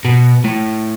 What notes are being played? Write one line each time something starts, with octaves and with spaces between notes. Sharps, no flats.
B2
A2